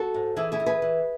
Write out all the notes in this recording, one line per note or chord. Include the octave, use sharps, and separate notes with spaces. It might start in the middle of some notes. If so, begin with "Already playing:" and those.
Already playing: F#4 A4
G#2
E3 E4 G#4
E4 G#4
E3
G#4 B4
E3